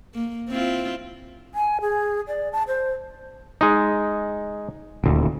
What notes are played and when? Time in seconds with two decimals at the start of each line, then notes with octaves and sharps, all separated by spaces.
0.14 A#3
0.49 C4 E4 F4
1.54 G#5
1.82 G#4
2.28 D5
2.53 A5
2.68 C5
3.61 G#3 D#4
5.04 D#1 D2